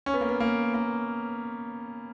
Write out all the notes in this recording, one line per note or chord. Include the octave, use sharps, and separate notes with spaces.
C#4
B3
A#3
B3
A#3
A#3